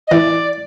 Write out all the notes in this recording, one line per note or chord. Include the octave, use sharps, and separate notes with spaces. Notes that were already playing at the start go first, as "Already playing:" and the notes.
D#5
E3 D5